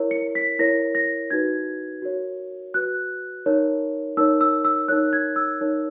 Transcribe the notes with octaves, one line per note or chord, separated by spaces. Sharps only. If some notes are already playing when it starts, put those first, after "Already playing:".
Already playing: E4 A#4 C#5
C#7
B6
E4 A#4 C#5 A#6
A#6
D#4 F#4 B4 G#6
F#4 A#4 C#5
F#4 B4 F#6
D#4 A#4 C#5
D#4 A#4 C#5 E6
E6
E6
D#4 A#4 C#5 F#6
G#6
E6
D#4 A#4 C#5